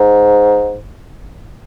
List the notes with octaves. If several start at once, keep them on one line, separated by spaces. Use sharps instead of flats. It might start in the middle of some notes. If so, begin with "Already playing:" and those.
Already playing: G#2